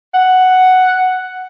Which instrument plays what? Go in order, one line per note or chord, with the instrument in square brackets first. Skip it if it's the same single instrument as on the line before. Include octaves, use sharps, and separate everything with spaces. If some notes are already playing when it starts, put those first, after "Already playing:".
[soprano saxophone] F#5